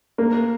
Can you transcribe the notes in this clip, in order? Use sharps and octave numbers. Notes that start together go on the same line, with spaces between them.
A#3